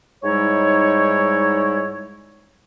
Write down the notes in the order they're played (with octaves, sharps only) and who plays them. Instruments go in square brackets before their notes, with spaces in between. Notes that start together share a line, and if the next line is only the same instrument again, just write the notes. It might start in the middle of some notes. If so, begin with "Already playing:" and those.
[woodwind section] G#2 G3 G#3 D#4 E4 C#5